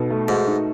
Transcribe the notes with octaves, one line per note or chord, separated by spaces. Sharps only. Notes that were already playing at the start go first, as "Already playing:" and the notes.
Already playing: B2 D#4 A4
A3
G#2 F#4
D#4